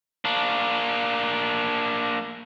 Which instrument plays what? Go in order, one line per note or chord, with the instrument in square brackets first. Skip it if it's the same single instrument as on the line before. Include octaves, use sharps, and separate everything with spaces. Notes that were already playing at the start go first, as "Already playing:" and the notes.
[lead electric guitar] A#3 D4